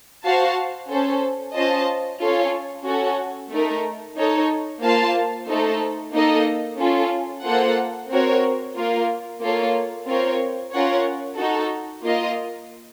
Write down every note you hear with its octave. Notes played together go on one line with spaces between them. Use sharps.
F#4 C5 F5 A5
C#4 A4 C5
C#4 F4 C5 D#5 A5
C#4 F4 A4 C#5
C#4 F#4 A4
A3 D#4 A#4
D#4 A4 C#5
A#3 F4 C5 F5 A5
A3 D#4 A4 C5
A#3 D#4 A4 D#5
C#4 F4 A4
A#3 F4 A4 C5 F#5
C4 F#4 A#4 C#5
A#3 F4 A#4
A#3 F4 A4 C#5
C4 F4 A#4 C#5
C#4 F4 A#4 C#5 F#5
D#4 F#4 A4
A#3 F4 A#4 D#5